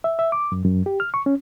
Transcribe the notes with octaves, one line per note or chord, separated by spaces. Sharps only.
E5
E5
D6
F#2
F#2
G4
F6
C#6
C#4